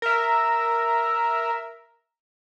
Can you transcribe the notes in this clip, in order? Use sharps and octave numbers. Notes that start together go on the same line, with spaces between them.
A#4 E5